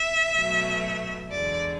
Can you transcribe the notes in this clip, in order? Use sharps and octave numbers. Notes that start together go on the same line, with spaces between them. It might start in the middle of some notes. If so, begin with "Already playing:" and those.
Already playing: E5
B2 F#3 A3
E2 D3 G#3 D5